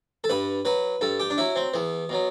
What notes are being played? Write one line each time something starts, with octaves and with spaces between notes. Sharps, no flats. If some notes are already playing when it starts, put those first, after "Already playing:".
A4
G2 B4
F#3 B4
G2 A4
G4
D4
F#3 E4
C4
E2 B3
B2 F#3